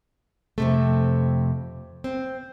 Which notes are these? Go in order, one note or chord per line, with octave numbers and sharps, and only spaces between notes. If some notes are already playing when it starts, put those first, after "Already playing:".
F2 C3 A3
C4